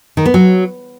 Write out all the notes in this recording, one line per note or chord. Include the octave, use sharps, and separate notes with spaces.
D#3
B3
F#3